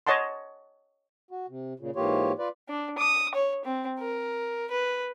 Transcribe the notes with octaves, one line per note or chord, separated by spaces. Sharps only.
C#5 D#5 F#5 A5 C6
F#4
C3
A#2 C#3
G#2 E3 A#3 F4 G4 C#5
F4 B4 D5
D4
D#6
C#5
C4
A#4
B4